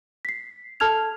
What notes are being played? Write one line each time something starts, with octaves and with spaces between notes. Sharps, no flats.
B6 C7
A4 A5 F6 G#6 F7